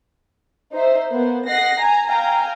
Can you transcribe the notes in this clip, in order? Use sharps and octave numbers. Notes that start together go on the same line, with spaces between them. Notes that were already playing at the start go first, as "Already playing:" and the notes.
D#4 C5 E5
A#3 B3 C5
D#5 F#5 A#6 C7
G#5 A#5
F5 G5 G#5 A#5